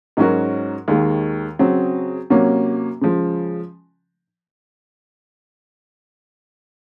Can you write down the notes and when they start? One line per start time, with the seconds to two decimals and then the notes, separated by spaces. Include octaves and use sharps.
0.17 G#2 F#3 C#4 F#4 A#4
0.88 D#2 D#3 G#3
1.59 C#3 F#3 C4
2.30 C3 F#3 A#3 C#4
3.01 C#3 F3 G#3